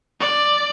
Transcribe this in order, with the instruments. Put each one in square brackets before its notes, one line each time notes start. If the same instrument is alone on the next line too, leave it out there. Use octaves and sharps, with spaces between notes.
[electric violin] D5